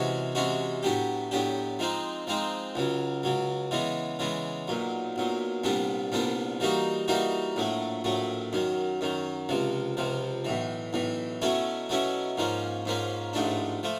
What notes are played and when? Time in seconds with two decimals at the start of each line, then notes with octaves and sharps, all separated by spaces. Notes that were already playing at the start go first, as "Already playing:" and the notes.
Already playing: C3 E3 G#3 C#4 F#4
0.35 C3 E3 G#3 C#4 F#4
0.83 A2 F#3 B3 D4 G4
1.31 A2 F#3 B3 D4 G4
1.79 F3 G#3 C4 D#4
2.27 F3 G#3 C4 D#4
2.75 C#2 C#3 F#3
3.23 C#2 C#3 F#3
3.71 C#3 E3 G#3 B3
4.19 C#3 E3 G#3 B3
4.68 B1 A#2 F#3
5.16 B1 A#2 F#3
5.64 C2 A#2 G3 B3 D4
6.12 C2 A#2 G3 B3 D4
6.60 E3 G3 A#3 D#4 F#4
7.08 E3 G3 A#3 D#4 F#4
7.56 A#1 A2 F#3 A3
8.04 A#1 A2 F#3 A3
8.53 F#2 D#3 F#3
9.01 F#2 D#3 F#3
9.49 C#2 C3 F3
9.97 C#2 C3 F3
10.45 B1 A2 E3
10.93 B1 A2 E3
11.42 B2 F#3 A3 C#4 E4
11.89 B2 F#3 A3 C#4 E4
12.37 G#2 F3 A#3 C#4
12.85 G#2 F3 A#3 C#4
13.33 A1 G#2 F3 A3 D4
13.83 F3 A3